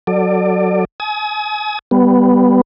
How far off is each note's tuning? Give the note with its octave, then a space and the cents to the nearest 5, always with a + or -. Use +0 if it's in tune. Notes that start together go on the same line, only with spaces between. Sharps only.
F#3 +0 A4 +15 D5 +25
G#5 +35 D#6 +35
G3 +0 B3 +5